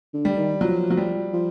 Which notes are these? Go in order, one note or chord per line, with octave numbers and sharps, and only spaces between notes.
D3
G3
D#3
F3 F#3
F#3
G3
F3